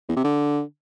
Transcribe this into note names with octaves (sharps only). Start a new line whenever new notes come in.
E2
C3
D3